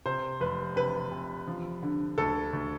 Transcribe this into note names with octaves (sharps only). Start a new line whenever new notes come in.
C3 C5
F1 B4
C3 B4
C3
F3
D3
D2 A4
D2